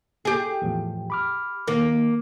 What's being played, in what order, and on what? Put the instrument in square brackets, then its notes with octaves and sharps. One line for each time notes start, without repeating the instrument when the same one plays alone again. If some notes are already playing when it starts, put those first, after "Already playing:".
[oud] G4 G#4
[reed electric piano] E2 A2 F3
B5 D6 F6
[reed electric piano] D#3 [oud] A#3